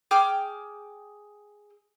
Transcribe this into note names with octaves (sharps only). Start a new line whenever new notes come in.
G#4 G5 D6 F6